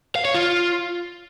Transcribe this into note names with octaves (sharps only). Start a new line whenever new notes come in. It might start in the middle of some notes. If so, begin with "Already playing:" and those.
F5
C#5
F4